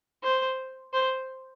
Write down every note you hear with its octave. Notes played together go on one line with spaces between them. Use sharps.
C5
C5